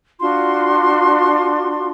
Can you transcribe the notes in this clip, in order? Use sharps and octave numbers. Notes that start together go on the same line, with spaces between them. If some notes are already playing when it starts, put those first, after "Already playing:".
D4 F4 F#4 C6